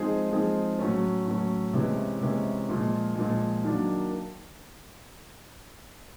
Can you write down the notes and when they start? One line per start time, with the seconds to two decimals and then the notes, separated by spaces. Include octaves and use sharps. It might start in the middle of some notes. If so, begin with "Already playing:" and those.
Already playing: F3 G#3 C4 D#4 G#4
0.31 F3 G#3 C4 D#4 G#4
0.79 A2 F#3 A3 C#4
1.26 A2 F#3 A3 C#4
1.73 C3 E3 G#3 C#4 E4
2.21 C3 E3 G#3 C#4 E4
2.69 A#2 F3 G#3
3.15 A#2 F3 G#3
3.64 D#3 F#3 A#3 D4